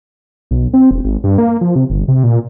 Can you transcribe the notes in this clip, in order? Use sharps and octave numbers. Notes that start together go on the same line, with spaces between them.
B1
C4
E1
G#1
G2
A#3
F3
C3
G1
C3
A#2